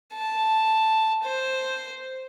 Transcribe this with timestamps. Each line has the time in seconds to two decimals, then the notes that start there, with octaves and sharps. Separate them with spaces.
0.14 A5
1.23 C5